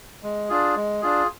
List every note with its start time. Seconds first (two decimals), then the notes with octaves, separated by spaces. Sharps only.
0.23 G#3
0.49 D4 F4 G#4
0.76 G#3
1.02 D4 F4 G#4